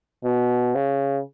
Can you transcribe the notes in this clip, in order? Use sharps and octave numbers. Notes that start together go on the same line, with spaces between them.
B2
C#3